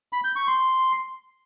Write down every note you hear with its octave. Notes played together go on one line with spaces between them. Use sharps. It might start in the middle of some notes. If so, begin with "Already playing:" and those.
B5
G6
C#6
C6